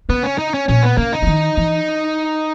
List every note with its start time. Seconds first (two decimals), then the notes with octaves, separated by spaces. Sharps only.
0.09 C#3 B3
0.23 C#4
0.38 D#4
0.54 C#4
0.68 A#2 C#4
0.83 B3
0.97 C#3 A#3
1.13 D#4
1.22 E3
1.27 D#3
1.57 E3